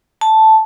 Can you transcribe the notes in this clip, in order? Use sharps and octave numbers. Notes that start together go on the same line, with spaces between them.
A5